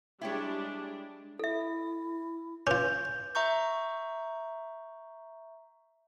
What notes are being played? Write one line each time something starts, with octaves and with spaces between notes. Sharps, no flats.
G3 G#3 D4 E4 G4 C#5
E4 A4 E5
C#4 F4 B4 D6 G6
E5 A#5 C#6 G6